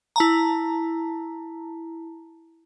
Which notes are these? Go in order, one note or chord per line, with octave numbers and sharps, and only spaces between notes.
E4 A5 A#5